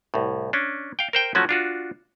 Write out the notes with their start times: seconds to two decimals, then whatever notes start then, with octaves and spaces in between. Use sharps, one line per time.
0.14 C2 A2
0.53 C#4 D4
0.99 F5 G5
1.13 A#4 C5 G5
1.35 F3 F#3 A3 C#4 F#4
1.49 D4 F4 F#4